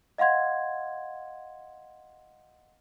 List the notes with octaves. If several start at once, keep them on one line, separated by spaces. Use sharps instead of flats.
D#5 F5 F#5 C6 G#6